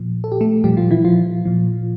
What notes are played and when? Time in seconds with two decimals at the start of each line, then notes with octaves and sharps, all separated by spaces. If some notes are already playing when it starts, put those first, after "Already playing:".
Already playing: A#2 F3
0.24 A4
0.32 G4
0.41 A3 A4
0.64 A#2 F3 G3 G4
0.77 F3 F4
0.91 E3 E4
1.05 F3 F4
1.45 A#2 F3